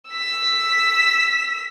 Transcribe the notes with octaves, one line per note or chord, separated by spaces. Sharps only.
E6 B6